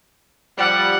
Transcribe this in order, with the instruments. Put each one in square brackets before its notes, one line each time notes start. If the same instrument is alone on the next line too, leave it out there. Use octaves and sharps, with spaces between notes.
[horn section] F3 G3 [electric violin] F#5